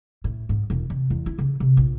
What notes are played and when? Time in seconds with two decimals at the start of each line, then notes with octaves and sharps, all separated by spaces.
0.24 A2
0.49 G#2
0.70 E1
0.90 C3
1.10 E2
1.26 E4
1.39 C#3
1.60 C3
1.77 A#1